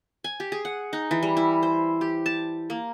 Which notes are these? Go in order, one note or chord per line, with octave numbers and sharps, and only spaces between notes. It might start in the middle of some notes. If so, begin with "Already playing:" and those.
G#5
G4
G#4
F#5
D#4
E3
G3
E4
C5
G4
A5
A#3